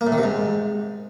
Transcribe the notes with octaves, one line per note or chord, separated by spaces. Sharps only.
A#3
A2
D#3
C3
G#2